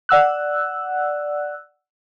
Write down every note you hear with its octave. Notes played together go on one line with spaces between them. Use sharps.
D5 F#5 E6 F#6